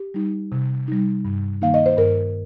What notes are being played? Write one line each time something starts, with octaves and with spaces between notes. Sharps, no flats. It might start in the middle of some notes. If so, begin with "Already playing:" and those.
Already playing: G4
G3 D#4
C3
G3 D#4
G2
D#3 A#3 D#4 F5
D#5
C5
G2 A#4